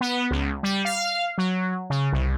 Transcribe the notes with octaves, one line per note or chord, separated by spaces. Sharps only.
B3
C#2
G3
F5
F#3
C#3
C2